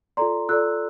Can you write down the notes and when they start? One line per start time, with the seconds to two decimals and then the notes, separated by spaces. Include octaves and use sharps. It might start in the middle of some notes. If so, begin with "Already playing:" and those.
0.17 F4 A4 D5 A#5 C6
0.49 F4 A4 D5 E6 F#6